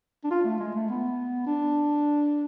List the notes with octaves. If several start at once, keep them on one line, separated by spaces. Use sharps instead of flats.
D4
F4
A3
G#3
A3
B3
D4